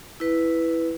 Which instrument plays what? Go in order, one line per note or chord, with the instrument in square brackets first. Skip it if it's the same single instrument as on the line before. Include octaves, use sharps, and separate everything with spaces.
[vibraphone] E4 B4